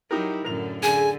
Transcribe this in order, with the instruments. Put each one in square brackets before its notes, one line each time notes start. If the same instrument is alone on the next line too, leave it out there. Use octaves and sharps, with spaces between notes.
[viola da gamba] F#3 E4 [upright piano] D#4 G4 A#4
[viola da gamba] F#2 A2 D3 [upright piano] A#4 F7
[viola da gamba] D3 [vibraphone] G#4 [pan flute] G#5 [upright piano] D#7